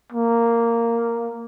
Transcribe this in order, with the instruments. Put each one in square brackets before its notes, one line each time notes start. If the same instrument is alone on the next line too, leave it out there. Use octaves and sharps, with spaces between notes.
[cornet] A#3